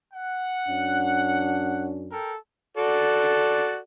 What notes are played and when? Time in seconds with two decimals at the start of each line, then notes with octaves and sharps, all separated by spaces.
0.14 F#5
0.68 F#2 C#4 D4
2.12 A4 A#4 G5
2.77 F#4 A4 D5